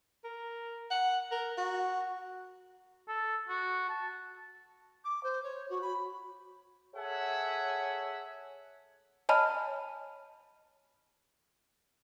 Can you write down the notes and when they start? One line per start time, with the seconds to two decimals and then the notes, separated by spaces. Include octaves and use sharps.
0.24 A#4
0.91 F#5
1.31 A#4
1.58 F#4
3.08 A4
3.49 F#4
3.89 A5
5.05 D6
5.24 C5
5.44 C#5
5.70 F#4
5.82 B5
6.95 G#4 A4 C#5 E5 F#5 G#5
9.29 C#5 D#5 G#5 A5 B5 F6